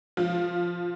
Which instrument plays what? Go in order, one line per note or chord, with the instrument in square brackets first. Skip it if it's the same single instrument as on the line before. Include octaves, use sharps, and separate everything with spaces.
[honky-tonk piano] F3